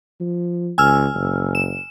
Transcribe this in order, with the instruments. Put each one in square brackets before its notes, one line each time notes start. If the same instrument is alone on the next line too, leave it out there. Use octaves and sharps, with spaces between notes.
[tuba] F3
[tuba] C#2 [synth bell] G#5 E6 F6
[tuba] F#1
[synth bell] E7